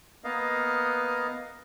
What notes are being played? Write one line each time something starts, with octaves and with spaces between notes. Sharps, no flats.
A#3 B3 D#5 F5